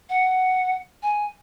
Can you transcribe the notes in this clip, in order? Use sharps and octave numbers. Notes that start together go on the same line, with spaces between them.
F#5
G#5